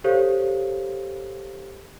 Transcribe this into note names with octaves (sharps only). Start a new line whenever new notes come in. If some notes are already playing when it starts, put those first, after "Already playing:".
G4 A4 C5 C#5 F5